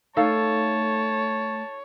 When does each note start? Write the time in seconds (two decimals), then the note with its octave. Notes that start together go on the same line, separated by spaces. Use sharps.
0.16 A3 D#4 A4 C#5 F5 A5